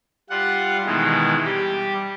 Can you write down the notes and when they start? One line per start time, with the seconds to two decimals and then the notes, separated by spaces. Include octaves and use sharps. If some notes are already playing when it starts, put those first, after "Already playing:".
0.30 G3 F4 F#5
0.86 B2 D#3 E3 G#3
1.45 G3 G4